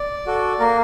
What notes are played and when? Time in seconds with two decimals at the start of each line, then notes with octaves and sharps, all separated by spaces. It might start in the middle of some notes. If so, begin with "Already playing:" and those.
Already playing: D5
0.27 F#4 A4
0.60 A#3 A#4